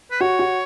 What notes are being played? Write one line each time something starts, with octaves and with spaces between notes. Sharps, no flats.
B4
F#4 C#5
F#4